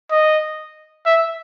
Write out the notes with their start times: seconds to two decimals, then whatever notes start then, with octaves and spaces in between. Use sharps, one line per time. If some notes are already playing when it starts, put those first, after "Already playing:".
0.11 D#5
1.06 E5